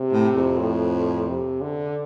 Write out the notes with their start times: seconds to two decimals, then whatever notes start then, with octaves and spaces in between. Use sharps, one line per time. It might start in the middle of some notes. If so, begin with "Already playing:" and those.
Already playing: C3
0.13 A2
0.36 F2
0.58 A2
1.27 C3
1.61 D3